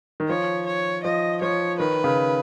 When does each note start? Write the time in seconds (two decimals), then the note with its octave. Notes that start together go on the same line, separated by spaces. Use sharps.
0.20 D#3
0.29 F3 C#5
0.66 C#5
1.04 F3 D#5
1.41 F3 C#5
1.79 D#3 B4
2.04 C#3